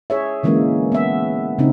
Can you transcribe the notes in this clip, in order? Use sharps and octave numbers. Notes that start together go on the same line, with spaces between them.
G#4 C#5 E5
D3 E3 G#3 A#3 C#4
B3 E5
C#3 C4 D#4